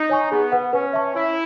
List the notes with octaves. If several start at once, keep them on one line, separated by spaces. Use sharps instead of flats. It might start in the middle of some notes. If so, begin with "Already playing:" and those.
Already playing: D#4
C#5 G#5 C#6
B3 G#4
B4 F#5
C#4 B4
E5 A5 C#6
E4 C#5